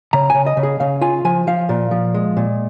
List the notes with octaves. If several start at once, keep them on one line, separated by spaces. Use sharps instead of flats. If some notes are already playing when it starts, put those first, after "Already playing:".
C#3 A#5
C#3 G#5
D#5
C#3
G#4
C#3 F5
F4 G#5
F3 G#5
F3 F5
A#2
F3
G#3
A#2